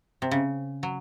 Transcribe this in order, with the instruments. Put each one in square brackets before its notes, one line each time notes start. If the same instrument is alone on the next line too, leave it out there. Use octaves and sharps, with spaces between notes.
[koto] C3
C#3
F#3